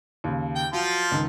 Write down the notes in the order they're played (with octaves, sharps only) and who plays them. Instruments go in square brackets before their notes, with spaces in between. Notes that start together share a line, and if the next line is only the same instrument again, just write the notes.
[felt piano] D#2 C#3
[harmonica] G5
[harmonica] F3 F4 [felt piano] F#3
[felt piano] C#2 D#3